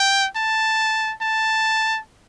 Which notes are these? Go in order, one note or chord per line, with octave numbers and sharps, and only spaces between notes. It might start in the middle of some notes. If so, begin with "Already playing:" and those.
Already playing: G5
A5
A5